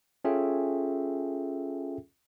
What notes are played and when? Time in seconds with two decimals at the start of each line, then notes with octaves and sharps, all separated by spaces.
0.24 C#4 F4 G#4 A4 E5 G5